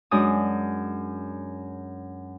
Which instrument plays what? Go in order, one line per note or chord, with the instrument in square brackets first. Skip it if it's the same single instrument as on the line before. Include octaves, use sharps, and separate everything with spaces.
[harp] F#2 G#3 D4 D#6